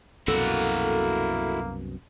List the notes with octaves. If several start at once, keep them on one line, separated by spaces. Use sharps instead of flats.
C2 F#2 B2 A#3 E4 F#4 A4